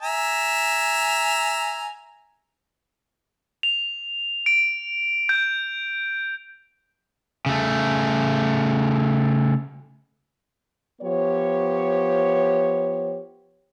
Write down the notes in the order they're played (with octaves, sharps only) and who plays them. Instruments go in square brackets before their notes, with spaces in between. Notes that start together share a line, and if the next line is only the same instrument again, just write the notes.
[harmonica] E5 G#5 A#5
[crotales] F7
D7
G6
[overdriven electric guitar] C#3 A3
[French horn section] F3 B3 G4 C#5